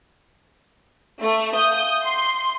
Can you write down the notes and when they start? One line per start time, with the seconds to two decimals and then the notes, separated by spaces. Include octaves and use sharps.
1.21 A3
1.55 E5 F5 G#5 D#6 G6
2.04 F#5 C6 D6